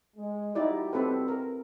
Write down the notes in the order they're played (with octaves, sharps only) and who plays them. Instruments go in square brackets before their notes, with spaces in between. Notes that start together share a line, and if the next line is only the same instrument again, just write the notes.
[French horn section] G#3
[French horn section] G3 F#4 G4 [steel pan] D#4 E4 D5
[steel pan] C4 A4 B4
A#4